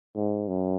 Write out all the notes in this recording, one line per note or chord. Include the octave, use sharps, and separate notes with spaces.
G#2
F#2